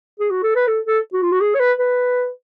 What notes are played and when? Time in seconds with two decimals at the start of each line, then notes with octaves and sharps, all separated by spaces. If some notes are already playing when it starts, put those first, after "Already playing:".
0.20 G#4
0.30 F#4
0.43 A4
0.55 B4
0.67 A4
0.86 A4
1.13 F#4
1.23 F4
1.32 F#4
1.41 G#4
1.54 C#5
1.60 B4
1.78 B4